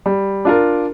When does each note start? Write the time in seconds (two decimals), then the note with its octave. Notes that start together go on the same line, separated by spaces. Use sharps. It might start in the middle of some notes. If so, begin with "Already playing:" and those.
0.06 G3
0.45 D4 F4 A#4